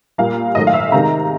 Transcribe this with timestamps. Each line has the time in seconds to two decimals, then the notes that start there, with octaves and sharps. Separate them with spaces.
0.18 A#2 G3 A#3 F5
0.55 G#2 D#3 F#3 A3 D#5
0.67 F5
0.74 E5
0.92 C3 D#3 G#3 A#5